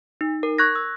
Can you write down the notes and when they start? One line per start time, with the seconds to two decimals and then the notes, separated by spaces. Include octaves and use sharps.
0.21 D#4
0.43 A#4
0.58 C#6 F#6 G#6 A#6
0.76 E6